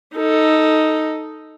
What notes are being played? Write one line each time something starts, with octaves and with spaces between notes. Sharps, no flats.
D#4 A4